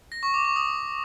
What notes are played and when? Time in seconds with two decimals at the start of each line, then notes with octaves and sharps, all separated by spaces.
0.12 A#6
0.23 C#6
0.34 D6
0.45 C#6
0.56 D#6